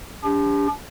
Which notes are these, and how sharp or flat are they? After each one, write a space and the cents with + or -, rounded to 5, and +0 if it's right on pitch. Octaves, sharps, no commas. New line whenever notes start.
D4 -35 G4 +35